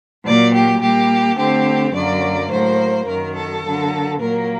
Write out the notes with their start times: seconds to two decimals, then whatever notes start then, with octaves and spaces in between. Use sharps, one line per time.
0.24 A#2 F#3 A#3 D5
0.53 G4
0.81 A#2 G3 A#3 G4
1.37 D3 A3 C4 G4
1.93 F#2 D3 F#3 A#3 D5
2.51 A2 F#3 A#3 C5
3.07 F#2 D#3 F#3 A#4
3.35 A4
3.64 D3 F#3 A#3
4.20 A#2 F#3 A#3 A#4